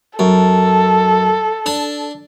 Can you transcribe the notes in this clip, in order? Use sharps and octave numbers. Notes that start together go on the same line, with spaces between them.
F#2 A4
D4 A5